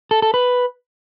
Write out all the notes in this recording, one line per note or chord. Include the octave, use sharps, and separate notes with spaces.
A4
A4
B4